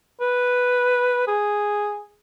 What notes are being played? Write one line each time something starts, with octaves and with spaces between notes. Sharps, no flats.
B4
G#4